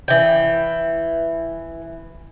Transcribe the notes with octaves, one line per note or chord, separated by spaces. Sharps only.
E3 G5